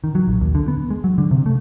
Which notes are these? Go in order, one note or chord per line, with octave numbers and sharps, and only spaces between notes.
D#3
F#3
A#1
D#2
D3
B3
G#3
F#3
D3
C3
A3